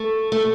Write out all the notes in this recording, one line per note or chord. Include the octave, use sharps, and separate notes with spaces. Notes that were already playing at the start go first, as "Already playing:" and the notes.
Already playing: A3
A3